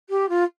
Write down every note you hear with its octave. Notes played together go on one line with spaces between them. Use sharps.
G4
F4